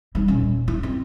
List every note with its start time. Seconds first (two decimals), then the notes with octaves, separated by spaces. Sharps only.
0.15 G3 D#4
0.28 D#1 C#4
0.68 E4
0.83 C4